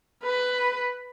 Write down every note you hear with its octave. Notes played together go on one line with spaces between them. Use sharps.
B4